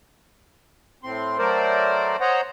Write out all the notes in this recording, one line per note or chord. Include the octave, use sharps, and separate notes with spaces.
A2 C4 C6
F#3 A3 A#4 C5 D5
C5 C#5 D#5 F#5 A#5